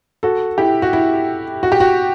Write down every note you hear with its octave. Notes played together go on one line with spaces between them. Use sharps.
F#4 A4
E4 G4
F#4
E4
F#4
G4
F#4